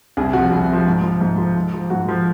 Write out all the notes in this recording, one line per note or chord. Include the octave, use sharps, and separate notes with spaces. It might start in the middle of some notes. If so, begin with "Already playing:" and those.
C2 G#4
C3 F3 F#4
C2 G#4
C3 F3
G#2
F3
G#2
F3
G#2
F3
G#2 F#4
F3